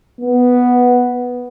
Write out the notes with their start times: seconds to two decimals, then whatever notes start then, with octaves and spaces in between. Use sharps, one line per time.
0.21 B3